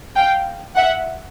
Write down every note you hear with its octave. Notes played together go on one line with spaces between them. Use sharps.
F5 G5
E5 F#5